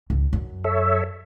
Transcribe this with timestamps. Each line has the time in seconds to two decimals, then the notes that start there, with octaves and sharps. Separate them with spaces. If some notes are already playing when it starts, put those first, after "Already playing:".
0.10 C#2
0.33 F#2
0.64 A4 C#5 E5